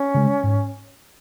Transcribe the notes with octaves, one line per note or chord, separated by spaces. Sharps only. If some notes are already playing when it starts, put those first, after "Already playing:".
Already playing: C#4
C#3 G#3
G#2